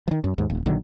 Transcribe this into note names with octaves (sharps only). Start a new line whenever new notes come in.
D#3 F3
F#2
D#2 G#2
D1
A#1 D3 D#3 F#3